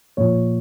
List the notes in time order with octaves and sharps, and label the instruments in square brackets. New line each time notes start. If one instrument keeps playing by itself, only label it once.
[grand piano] A#2 F3 C#5